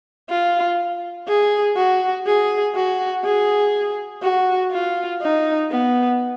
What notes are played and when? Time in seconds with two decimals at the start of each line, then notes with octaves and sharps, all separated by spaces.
0.29 F4
1.28 G#4
1.76 F#4
2.26 G#4
2.75 F#4
3.24 G#4
4.23 F#4
4.73 F4
5.22 D#4
5.71 B3